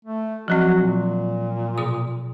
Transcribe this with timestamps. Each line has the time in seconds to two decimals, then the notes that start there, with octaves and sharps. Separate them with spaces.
0.05 A3
0.48 F3 F#3 C4 F#4
0.80 A#2
1.78 B2 D#6